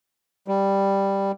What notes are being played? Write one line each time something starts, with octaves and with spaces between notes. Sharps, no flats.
G3